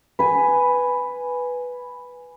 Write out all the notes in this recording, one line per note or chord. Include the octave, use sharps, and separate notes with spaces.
B4 G#5